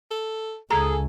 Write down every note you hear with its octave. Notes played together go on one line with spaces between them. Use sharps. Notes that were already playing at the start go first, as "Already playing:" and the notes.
A4
C#2 G#4 A4 A#5